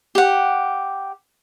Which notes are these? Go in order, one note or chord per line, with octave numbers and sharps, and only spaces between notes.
G4 F#5